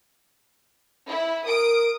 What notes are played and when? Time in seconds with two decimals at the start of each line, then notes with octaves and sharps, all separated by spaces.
1.08 E4
1.46 A#4 D#6 D7